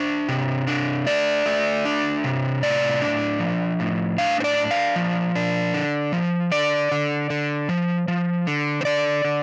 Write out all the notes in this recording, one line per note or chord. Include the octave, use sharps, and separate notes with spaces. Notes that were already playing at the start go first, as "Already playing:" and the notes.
Already playing: D4 C5
C3
D4
A3 D5
A3
D4
C3
A2 D5
D4
F3
A2
D4 F5
C5
D5
D4
F5
F3
D4
D3
F3
D3 D5
D3
D3
F3
F3
D3
C5
D3 D5
D3